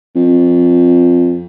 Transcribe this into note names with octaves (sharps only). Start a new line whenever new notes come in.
F2